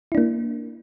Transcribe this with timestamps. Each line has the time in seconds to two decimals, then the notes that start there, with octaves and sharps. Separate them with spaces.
0.12 E4
0.15 D4
0.18 A#3